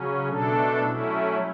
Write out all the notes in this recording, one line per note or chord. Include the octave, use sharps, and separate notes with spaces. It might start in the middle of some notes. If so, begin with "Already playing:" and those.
Already playing: C#3 F#3 C#4
B2 A3 D4 A4
F#3 A3 C#4 E4